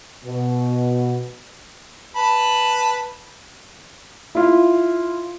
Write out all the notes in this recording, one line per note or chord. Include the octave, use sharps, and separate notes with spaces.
B2
B4 A5 B5
E4 F4